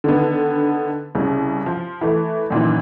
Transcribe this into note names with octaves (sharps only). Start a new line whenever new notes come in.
D3 D#3 B3
C2 C#3
F3
E3 A3
F#2 A#2 D#3 E3